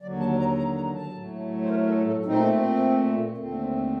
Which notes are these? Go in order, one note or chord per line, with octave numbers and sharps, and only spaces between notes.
D#2 D3 F#3 D5
A5
A#5
A#5
A#5
A5
A2 F#3 A3
C5
A#4
A4
A4
A#2 A3 C4 D#4
C4
D#2 D3 A3 C4